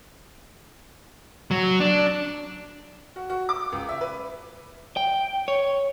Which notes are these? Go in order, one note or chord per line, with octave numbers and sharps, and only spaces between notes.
F#3
D4
F#4
F#4
D6
C#2
E5
B4
G5
C#5